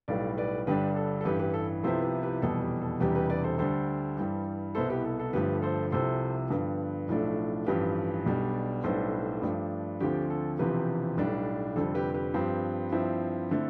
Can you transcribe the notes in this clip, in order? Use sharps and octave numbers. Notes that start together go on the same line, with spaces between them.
B1 A2 G3 B3 D5 F5
B4 D5
G1 G2 D3 G3 D4 G4 B4
A4
A4
A1 G2 E3 G4 B4
G4 B4
A4
C2 C3 F3 B3 E4 A4 C5
G4 B4
G4 B4
F1 E2 B2 G3 A4
G4
A4
E1 E2 C3 G3 G4 B4
G4 B4
B4 D5
A4 C5
D2 D3 G3 A4 C5
G2 E3 G3
C2 B2 B3 E4 A4 C5
G4 B4
A4
A4
G1 G2 F3 A3 G4 B4
A4 C5
C2 C3 F3 A4 C5
G2 D3 F3 B3
B1 A2 F3 A3 D4
A1 G2 F3 G4 B4
B1 B2 G3 D4
B1 A2 G3 B3 D4 A4 C5
G2 F3 A3 D4
D2 D3 F3 C4 G4
A4
E1 E2 C3 F3 C4 G4 B4
B1 A2 G3 D4
F1 F2 D3 G3 C4 A4
G4 B4
G4 B4
G2 F3 C4
G2 F3 C4 E4
D3 A3 C4 E4 A4